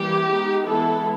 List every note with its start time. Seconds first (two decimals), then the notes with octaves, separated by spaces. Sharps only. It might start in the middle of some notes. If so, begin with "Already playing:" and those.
Already playing: E3 G3 A#3 G4
0.29 G#3 B3 D#4
0.67 E3 G#3 B3 E4 A4